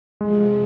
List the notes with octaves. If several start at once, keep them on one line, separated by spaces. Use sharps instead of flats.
F2 C3 F3 G#3